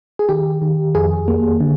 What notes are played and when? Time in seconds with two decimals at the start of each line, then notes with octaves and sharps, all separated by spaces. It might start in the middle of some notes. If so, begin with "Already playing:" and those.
0.19 G#4
0.29 D#3 G4
0.62 D#3
0.95 F2 G#4
1.28 A#3
1.60 D3